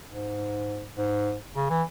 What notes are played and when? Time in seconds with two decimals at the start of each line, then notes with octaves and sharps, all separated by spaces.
0.10 G#2
0.97 G#2
1.55 C#3
1.70 E3